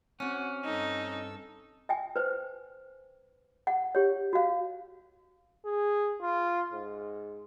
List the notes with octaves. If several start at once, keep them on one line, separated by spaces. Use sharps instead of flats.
C4 C#4 F#4 F#5 F6
G2 D#4 A4 E6
E5 G5 G#5
B4 C5
F#5
G4 C#5
F#4 F5
G#4
F4
G#2